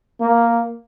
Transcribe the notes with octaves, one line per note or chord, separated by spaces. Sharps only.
A#3